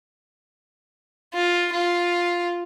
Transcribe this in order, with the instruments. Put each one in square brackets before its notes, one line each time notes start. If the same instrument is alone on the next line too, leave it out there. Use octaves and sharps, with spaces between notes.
[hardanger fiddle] F4
F4